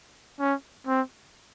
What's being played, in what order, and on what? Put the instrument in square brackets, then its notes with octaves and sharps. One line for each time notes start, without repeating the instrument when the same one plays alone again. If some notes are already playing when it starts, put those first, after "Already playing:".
[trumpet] C#4
C4